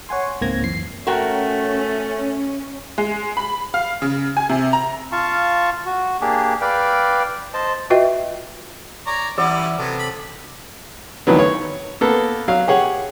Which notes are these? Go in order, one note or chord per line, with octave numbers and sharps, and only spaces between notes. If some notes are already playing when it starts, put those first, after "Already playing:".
C#5 F#5 G#5 C6
C#2 G#2 A#3 C4 G#6 A#6
F#2 E3 C7
A3 C#4 F#4 A#4 G5
G#3
B5
F5
C#3
G#5
C3
A#5
F4 F5 A5 C#6
F#4
A#3 D4 G4 G#4
B4 D5 F5 G5
C5 D#5 A5
F4 F#4 B4 D#5 E5 G5
C#5 D5 A#5
E3 G3 C#4 E4 D5 F#5 E6
C3 F#3 B3 A4 D6
B5
D2 D#3 E3 F#3 B3
C#5
A#3 B3 A4
F#3 F5
G4 G#4 C#5 F#5